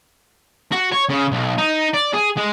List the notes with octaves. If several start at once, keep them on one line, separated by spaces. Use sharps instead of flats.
F#4
C#5
C#3
B1
D#4
D5
G#4
G#3